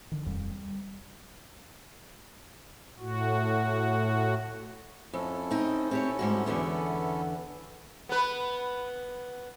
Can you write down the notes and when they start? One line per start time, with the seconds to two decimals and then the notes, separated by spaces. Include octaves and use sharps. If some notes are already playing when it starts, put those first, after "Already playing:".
0.12 D3 D#3
0.25 D#1 F2 G3
0.51 G3
3.00 A2 F#4
5.14 F2 C#4 E4 A4
5.51 C4 D#4
5.91 C4 G4 C#5
6.19 G#2 G3 F#4
6.46 E2 D3 B3
8.09 B3 B4